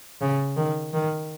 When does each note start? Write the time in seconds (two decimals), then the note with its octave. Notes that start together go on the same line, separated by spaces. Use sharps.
0.21 C#3
0.57 D#3
0.94 D#3